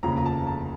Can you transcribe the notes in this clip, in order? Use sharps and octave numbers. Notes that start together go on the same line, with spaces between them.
F1 D#2 C#3 F3 A#5
A#5
A5
A5